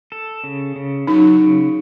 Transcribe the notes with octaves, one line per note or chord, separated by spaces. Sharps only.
A4
C#3
C#3
F#3 D#4
C#3